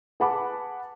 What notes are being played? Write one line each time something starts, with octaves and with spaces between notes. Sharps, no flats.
G#4 B4 F#5 A5 B5 D6